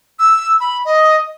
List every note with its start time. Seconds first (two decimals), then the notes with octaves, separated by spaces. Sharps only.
0.19 E6
0.60 B5
0.85 D#5